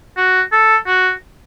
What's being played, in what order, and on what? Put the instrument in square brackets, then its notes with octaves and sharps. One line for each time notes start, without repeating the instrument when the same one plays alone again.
[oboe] F#4
A4
F#4